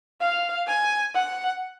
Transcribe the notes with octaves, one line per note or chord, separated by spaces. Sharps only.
F5
G#5
F#5